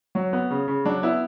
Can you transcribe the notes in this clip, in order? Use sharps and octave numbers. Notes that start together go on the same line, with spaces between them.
F#3
B3
C#3
C#3
F#3 D4
B3 E4